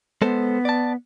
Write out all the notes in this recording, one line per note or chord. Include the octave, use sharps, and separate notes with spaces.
G#3 B3 A4 C5
D5 A5